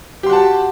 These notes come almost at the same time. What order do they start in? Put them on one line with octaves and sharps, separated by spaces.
G4 C6 F#4 A5